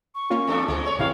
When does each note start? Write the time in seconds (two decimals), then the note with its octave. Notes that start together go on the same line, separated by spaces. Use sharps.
0.15 C#6
0.30 A#3 C#4 F4
0.47 E2 D4 A4
0.68 D2 G#2 G#3
0.84 G#3 C#5 C#6
0.98 A1 C3 E3 F5